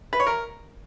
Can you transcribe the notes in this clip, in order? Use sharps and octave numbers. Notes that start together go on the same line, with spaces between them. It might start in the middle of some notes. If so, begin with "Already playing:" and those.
B4
C#5
A#4